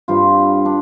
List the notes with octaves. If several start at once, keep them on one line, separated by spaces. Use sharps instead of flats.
G2 G3 C4 F4
D4